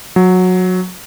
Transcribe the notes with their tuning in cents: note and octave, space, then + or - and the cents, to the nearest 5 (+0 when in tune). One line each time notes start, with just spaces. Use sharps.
F#3 -15